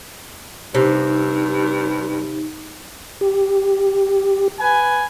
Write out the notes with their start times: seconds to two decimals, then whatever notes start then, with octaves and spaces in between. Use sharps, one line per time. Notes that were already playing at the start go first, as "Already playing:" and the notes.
0.75 G2 C3 D#4
3.21 G4
4.59 B4 G#5